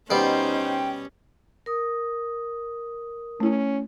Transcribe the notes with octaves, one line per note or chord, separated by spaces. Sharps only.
B2 G3 C#4 D#4 C5 G5
A#4 D#6
A3 C#4 E4